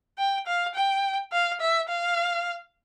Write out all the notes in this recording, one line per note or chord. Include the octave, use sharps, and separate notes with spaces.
G5
F5
G5
F5
E5
F5